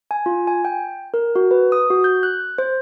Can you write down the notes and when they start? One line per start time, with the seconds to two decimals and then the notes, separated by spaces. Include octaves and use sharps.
0.11 G#5
0.26 F4
0.47 G#5
0.65 G5
1.14 A#4
1.36 F#4
1.51 B4
1.72 D#6
1.90 F#4
2.04 G6
2.23 F#6
2.58 C5